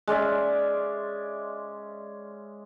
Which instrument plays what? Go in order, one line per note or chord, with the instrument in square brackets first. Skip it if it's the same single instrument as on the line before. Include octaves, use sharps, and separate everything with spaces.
[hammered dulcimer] G#3 C#4 D5 E5